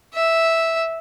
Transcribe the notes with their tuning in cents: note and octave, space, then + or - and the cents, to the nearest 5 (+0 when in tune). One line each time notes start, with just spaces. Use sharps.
E5 -5